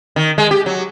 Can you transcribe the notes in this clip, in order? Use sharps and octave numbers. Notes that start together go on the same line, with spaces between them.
D#3
G#3
G4
F#3